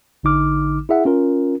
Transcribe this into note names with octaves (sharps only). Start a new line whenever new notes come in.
A1 D3 D#4 D6 F6
E4 G#4 E5 F#5
C#4 F4 A#4